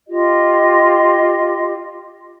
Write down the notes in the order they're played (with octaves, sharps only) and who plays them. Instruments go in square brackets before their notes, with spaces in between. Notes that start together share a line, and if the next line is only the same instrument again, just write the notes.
[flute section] F4 G4 D#5